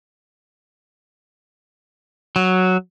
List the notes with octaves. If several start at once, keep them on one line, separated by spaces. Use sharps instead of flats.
F#3